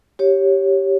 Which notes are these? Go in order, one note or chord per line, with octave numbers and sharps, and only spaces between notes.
G4 C#5